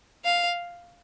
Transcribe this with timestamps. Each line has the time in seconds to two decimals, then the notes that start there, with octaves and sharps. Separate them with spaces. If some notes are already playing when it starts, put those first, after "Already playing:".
0.25 F5